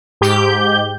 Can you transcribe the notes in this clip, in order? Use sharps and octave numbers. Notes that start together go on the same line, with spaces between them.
G#2 G4 G6